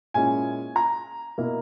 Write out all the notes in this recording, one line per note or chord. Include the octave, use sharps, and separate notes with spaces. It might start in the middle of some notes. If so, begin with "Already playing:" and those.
A#2 G#3 C#4 E4 G#5
A#5
B2 A#3 E4